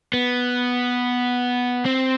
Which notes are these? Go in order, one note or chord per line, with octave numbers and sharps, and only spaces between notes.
B3
C4